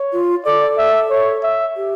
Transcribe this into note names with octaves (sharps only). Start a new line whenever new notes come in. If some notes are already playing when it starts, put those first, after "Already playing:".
Already playing: C#5
F4
A4 D5
E5
C#5
E5
G4